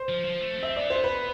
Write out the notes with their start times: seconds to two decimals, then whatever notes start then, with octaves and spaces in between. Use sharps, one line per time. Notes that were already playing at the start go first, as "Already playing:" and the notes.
Already playing: C5
0.09 F3
0.25 F3
0.40 A3
0.56 C4
0.63 E5
0.76 B3 D5
0.90 C5
1.04 B4